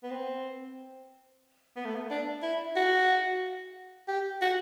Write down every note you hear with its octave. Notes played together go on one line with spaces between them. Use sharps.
B3
C4
B3
A3
B3
D4
E4
F#4
G4
F#4